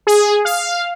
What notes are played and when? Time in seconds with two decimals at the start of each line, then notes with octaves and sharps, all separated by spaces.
0.07 G#4
0.45 F5